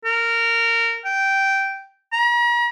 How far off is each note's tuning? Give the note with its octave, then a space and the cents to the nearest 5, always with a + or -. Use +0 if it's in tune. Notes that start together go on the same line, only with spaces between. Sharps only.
A#4 -15
G5 -10
A#5 +45